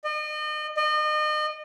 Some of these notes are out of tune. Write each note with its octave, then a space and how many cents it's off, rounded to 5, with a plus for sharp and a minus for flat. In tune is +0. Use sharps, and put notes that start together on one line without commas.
D#5 -40
D#5 -35